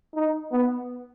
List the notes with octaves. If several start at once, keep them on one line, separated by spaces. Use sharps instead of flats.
D#4
B3